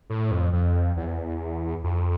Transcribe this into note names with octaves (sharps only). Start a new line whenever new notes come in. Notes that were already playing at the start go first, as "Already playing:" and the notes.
A2
F2
F2
E2
F2